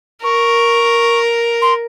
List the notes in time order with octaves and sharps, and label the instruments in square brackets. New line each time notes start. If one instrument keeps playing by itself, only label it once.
[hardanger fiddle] A#4 [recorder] C#6
[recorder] C6